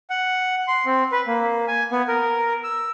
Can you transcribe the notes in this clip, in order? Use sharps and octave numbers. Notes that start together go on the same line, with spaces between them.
F#5
C6
C4
B4
A#3
G#5
B3
A#4
E6